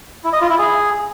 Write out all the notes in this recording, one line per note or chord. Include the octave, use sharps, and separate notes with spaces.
E4
D#5
F4
E4
G#4